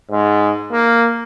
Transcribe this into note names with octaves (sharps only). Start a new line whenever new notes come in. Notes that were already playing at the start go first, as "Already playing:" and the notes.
G#2
A#3